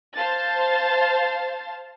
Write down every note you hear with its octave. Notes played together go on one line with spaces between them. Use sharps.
C5 F5 A5 A6